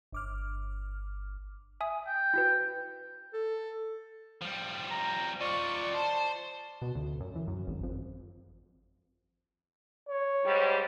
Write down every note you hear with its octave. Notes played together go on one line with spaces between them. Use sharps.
G1 D6 F6
E5 G#5 D#6
G5
E4 F#4 B4
A4
F3 G3
A#5
F4 D5 D#5 C#6
C5 A5
B2
D2
F#2
E3
F#2
G#1
F2
C#5
G#2 G3 G4